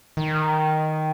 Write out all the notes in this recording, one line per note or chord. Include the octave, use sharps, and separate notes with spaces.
D#3